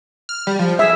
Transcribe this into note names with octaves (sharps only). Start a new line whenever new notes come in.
F6
G3
F3
G#4 E5